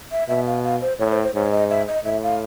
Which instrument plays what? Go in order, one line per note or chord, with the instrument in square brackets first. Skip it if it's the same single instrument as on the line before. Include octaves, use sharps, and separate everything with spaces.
[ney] E5
[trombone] B2 [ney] E5
[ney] F5
F5
C5
[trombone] A2 [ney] C#5
[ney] C5
C5
[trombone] G#2 [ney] C#5
[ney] D#5
E5
D#5
[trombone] A2 [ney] E5
[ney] F5